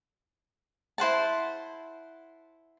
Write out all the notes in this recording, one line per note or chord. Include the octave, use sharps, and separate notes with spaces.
E4 C5 F#5 A5